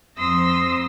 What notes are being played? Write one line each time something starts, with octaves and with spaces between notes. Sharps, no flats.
F2 F3 C6 D#6 E6 A#6